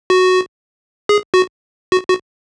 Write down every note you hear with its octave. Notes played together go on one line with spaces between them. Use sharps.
F#4
G#4
F#4
F#4
F#4